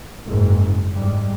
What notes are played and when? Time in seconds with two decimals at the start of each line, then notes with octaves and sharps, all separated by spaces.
0.26 F#1 G#2
0.94 G#2 G3